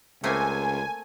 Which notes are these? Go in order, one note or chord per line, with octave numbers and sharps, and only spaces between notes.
C#2 A3 A#3 C4 G#5